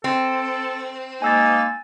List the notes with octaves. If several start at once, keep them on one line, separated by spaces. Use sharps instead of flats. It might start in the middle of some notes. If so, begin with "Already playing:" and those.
C4 A4
G#3 A#3 D#4 G#5 E6 A6